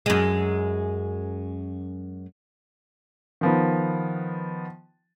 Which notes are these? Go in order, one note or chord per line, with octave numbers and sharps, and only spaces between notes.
F#2 G#3
D#3 F3 B3